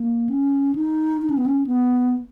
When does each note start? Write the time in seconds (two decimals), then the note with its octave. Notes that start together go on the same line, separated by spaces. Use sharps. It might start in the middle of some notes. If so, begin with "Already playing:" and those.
Already playing: A#3
0.29 C#4
0.75 D#4
1.22 D#4
1.30 C#4
1.37 B3
1.46 C#4
1.67 B3